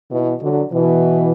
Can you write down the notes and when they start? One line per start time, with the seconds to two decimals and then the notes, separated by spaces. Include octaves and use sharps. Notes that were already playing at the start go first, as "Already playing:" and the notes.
0.10 B2 E3
0.41 D3 F#3
0.73 B2 E3